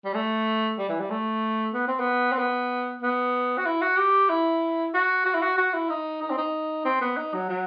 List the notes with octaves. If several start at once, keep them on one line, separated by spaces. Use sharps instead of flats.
G3
A3
G3
E3
G3
A3
B3
C4
B3
C4
B3
B3
F#4
E4
F#4
G4
E4
F#4
F#4
E4
F#4
F#4
E4
D#4
D#4
C4
D#4
C4
B3
D#4
F#3
F#3